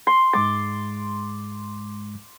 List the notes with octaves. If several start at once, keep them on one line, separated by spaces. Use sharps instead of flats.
C6
G#2 G#3 D6 A6